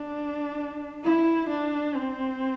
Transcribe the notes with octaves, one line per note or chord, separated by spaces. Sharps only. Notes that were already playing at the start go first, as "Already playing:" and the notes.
Already playing: D4
E4
D4
C4